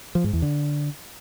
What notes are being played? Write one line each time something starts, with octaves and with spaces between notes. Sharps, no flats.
F3
G#2
E2
D3